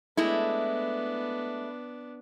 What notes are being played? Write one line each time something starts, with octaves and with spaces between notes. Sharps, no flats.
G#3 A3 B3 D4 E4